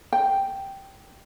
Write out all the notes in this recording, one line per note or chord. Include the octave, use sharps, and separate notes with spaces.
G5